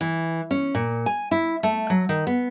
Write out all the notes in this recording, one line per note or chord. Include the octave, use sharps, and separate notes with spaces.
E3
C#4
A#2
G#5
E4
A3
F#3
D#3
B3